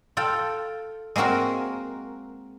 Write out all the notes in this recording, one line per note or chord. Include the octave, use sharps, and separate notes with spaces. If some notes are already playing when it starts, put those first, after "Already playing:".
F4 A4 G5
G#3 A#3 C4 F#4 A#4